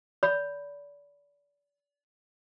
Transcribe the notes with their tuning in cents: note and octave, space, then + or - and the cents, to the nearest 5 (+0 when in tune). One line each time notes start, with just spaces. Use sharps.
D5 -30 B5 +0